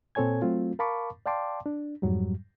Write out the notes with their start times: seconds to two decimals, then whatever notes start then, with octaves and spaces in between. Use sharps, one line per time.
0.15 A#2 C4 A4 C#5 G#5 G#6
0.42 F#3 A3 C4 F4
0.79 A#4 F5 A5 B5 C#6 D6
1.26 D5 F5 G5 A5 C6 D6
1.66 D4
2.02 F2 G#2 F#3 G3